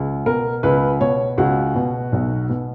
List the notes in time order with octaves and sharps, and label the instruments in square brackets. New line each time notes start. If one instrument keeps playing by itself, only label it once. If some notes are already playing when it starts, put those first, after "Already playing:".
Already playing: [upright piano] C#2
B2 A#4
C#2 B4
B2 C#5
C#2 F#4
B2
B1
B2